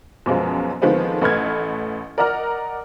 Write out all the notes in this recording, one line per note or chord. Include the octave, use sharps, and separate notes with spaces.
F#2 B2 F3 G#3
D3 D#3 F3 G#3 B3 C4
A1 A3 B4 F6 G#6
A#4 D5 D#5 F#5 A#5 F6